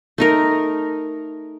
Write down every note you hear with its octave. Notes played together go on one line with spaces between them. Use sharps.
A3 D#4 A#4